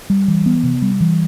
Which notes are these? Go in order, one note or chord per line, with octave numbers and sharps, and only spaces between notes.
G3
E3
B3
C3
G3
E3